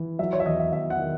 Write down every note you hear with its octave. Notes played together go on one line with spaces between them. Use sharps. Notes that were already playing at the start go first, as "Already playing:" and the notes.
Already playing: E3
F#3 E5
C#5
E5
E2 D#5
E5
E2 E5
F#5
D#3